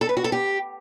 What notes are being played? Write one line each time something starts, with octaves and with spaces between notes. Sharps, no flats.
A4
B4
F#4
A4
G4